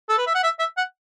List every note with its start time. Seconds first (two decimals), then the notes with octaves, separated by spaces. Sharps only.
0.09 A4
0.18 B4
0.27 E5
0.34 F#5
0.43 E5
0.59 E5
0.77 F#5